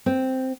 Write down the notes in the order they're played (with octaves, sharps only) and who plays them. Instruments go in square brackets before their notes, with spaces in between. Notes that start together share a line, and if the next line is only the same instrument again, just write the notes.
[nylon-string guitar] C4